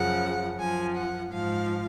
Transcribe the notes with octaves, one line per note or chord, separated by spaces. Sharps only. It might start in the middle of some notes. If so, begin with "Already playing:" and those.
Already playing: F#2 C#3 F3 F#5
F#2 F3 G#5
F#5
G#2 F3 F5